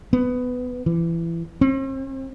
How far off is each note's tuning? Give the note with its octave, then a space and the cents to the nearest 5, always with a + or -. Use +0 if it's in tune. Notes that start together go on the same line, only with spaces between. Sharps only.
B3 +15
E3 +25
C4 +45